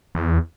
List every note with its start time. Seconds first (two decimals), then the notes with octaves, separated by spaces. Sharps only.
0.15 E2